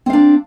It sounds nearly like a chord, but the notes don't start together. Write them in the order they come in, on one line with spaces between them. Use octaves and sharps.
C4 F5 D4